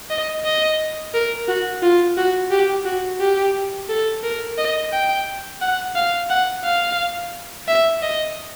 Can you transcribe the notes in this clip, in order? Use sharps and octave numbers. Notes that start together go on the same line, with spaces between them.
D#5
D#5
A#4
F#4
F4
F#4
G4
F#4
G4
A4
A#4
D#5
G5
F#5
F5
F#5
F5
E5
D#5